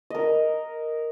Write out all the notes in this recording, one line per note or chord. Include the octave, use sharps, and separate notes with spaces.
A#4 D#5